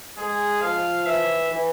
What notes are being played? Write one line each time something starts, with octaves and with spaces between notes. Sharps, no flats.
G#3 G#4
F3 F5
E3 E5
E3